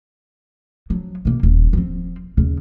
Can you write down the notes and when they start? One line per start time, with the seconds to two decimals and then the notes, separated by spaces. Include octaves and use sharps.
0.90 F3 F#3
1.25 B2 A#3
1.43 D#1
1.73 F3 C4
2.37 D#2 C#3